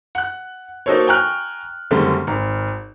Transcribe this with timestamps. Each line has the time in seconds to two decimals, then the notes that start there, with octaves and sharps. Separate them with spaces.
0.15 F#5 F#6
0.86 A#3 D#4 F#4 A4 C5 C#5
1.07 G5 G#5 A#5 C#6 F6 F#6
1.91 F#2 D3 D#3 G3 A3 C4
2.27 G#1 A#5